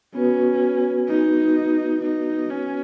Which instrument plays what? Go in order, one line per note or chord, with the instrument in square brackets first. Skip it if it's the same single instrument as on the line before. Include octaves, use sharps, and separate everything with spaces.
[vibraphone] B3 F#4 B4 [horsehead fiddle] C#4
[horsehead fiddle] D#4
D#4
C#4